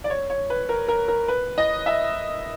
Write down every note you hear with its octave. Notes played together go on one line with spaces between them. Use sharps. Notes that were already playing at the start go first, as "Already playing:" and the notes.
D5
C#5
C#5
B4
A#4
A#4
A#4
B4
D#5
E5